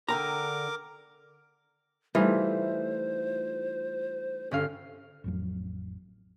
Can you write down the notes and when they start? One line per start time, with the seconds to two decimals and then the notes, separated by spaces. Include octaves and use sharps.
0.09 D3 A#4 G5 A#5 D6
2.15 E3 G3 A3 D#4 F4 C5
4.51 G1 C#4 A4 F5
5.24 A1 F2 F#3